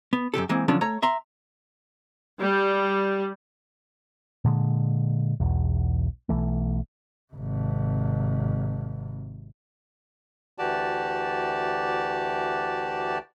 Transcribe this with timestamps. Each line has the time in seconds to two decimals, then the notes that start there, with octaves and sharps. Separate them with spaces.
0.13 B3
0.34 F#2 C3 G4 A4
0.49 E3 G#3 A#3 C4
0.68 D3 F3 F#3 C#4 D4
0.81 A3 C#5 A#5
1.02 E5 A#5 C6
2.39 G3
4.44 A#2 D3 G#3
5.40 E1 B1 E2
6.29 B1 E3 A3
7.33 G#1 C3
10.58 D2 E3 F#4 G4 D5 A5